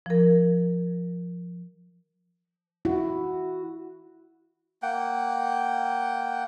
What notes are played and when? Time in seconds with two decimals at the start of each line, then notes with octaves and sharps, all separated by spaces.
0.06 F3 A#4
2.85 E4 F#4
4.82 A#3 F#5 G5